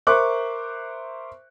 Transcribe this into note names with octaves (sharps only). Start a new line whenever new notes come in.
A#4 C5 E5 C#6 D6 F#6